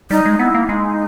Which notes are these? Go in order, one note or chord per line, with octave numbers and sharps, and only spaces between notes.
G3 D#4
G#3
B3 E4
A#3
G#3 D#4